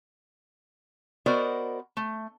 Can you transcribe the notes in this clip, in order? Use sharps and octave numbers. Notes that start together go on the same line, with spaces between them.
B3 F#4 A#4 C5 D5 D#5
A3